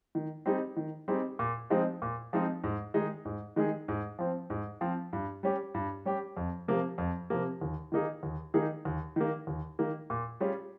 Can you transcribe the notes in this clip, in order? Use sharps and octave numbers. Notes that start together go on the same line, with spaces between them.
D#3
G3 C4 D#4 G#4
D#3
G3 C4 D#4 G#4
A#2
F3 G#3 C4 D#4
A#2
F3 G#3 C4 D#4
G#2
D#3 G#3 D#4 G#4
G#2
D#3 G#3 D#4 G#4
G#2
F3 C4
G#2
F3 C4
G2
G3 C#4 G4
G2
G3 C#4 G4
F2
C3 F3 A#3
F2
C3 F3 A#3
D#2
D#3 A#3 D#4 G#4
D#2
D#3 A#3 D#4 G#4
D#2
D#3 A#3
D#2
D#3 A#3
A#2
G3 C#4 F4 G#4